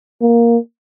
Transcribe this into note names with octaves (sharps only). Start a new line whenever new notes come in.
A#3